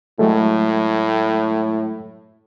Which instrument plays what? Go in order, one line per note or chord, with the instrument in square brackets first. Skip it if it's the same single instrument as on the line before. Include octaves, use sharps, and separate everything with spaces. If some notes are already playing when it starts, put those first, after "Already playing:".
[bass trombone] A2 [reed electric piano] F#3 G#3 A3